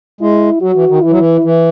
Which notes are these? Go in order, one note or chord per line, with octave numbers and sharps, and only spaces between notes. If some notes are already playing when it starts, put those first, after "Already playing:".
G#3 E4
F#3 F#4
E3
D#3
E3 E4
F#3
E3
E3